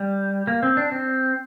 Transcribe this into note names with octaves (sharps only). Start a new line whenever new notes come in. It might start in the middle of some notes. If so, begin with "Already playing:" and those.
Already playing: G3
A#3
C4
D4
C4